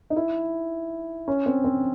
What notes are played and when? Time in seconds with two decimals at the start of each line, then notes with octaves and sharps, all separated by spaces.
0.10 D#4
0.16 E4
1.28 C#4
1.46 C4
1.64 C4